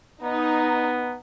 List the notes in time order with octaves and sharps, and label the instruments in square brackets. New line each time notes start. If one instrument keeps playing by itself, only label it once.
[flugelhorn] B3 [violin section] D#4